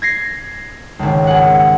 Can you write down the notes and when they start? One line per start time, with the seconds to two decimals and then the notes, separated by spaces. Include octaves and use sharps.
0.02 G#6 A#6 C7
0.99 G#1 C#2
1.27 G#4 F#5